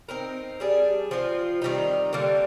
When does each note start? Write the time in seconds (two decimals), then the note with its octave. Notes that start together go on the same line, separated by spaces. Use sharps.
0.09 C4 D#4 A#4
0.60 G3 D4 G#4
1.11 F3 C4 F4
1.62 D#3 G3 C4 D#4
2.13 D3 G3 A#3